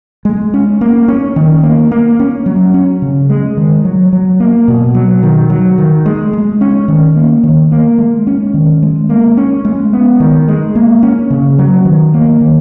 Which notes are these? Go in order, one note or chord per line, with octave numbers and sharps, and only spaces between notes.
G#3
C#4
A#3
C#4
D#3
A#3
A#3
C#4
F#3
C#4
C#3
G#3
D#3
F#3
F#3
A#3
B2
F#3
D#3
F#3
D#3
G#3
G#3
C#4
D#3
A#3
D#3
A#3
G#3
C#4
D#3
G#3
A#3
C#4
G#3
B3
D#3
G#3
A#3
C#4
C#3
F#3
D#3
A#3
D#3